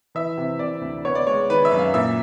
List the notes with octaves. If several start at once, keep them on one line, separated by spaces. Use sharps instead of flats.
E3 E5
C3
C3 D5
D2
B3 C#5
D5
G#3 C#5
D#3 B4
E5
F#2
F5
A#2 E5